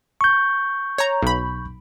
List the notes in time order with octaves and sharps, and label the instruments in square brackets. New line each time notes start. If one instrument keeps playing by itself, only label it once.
[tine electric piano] C#6 G6
[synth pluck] C#5 A#5
B1 B5